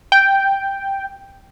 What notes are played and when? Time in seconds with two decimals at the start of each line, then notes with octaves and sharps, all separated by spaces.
0.12 G5